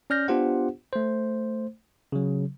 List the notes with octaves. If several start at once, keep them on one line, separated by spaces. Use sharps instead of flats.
C#4 D5 F6 G6 A#6
B3 D4 F4 G4 C5 F#5
A3 C5
C#3 F#3